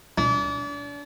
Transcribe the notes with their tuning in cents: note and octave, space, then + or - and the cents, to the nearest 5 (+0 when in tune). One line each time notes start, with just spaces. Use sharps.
D4 -35